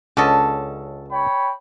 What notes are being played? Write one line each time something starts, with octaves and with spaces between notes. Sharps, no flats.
C#2 D3 C#4 A4 D#5
C#5 G5 B5